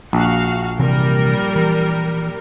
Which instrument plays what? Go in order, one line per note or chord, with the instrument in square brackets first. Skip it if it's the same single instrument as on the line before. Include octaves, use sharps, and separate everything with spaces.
[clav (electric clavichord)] A#1 [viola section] F#4 F5
[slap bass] C3 E3 C4 [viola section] G3 A#4
[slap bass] E3